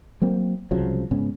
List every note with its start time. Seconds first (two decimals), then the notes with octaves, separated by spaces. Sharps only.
0.22 F#3 A#3 C4
0.71 C2 C#3 F3 F#3
1.11 G#2 C#3 B3 C#4